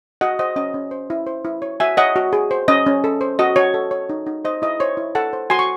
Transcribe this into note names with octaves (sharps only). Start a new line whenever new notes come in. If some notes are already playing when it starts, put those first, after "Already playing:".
F#4 D#5 F#5
C5 D#5
C#4 D#5
C#4
C5
E4
C5
E4
C#5
F#4 E5 G#5
C#5 D#5 F#5
F#4
G#4
C5
C#4 D#5
C#4
A4
C5
F#4 D#5
F#4 C#5
A4
C#5
D#4
D#4
C5 D#5
E4 D#5
C5 C#5
E4
A4 F#5 A5
C5
F#4 G#5 C6
C#6